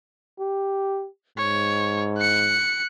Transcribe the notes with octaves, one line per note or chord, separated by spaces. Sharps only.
G4
G#2 C#5
F#6 C#7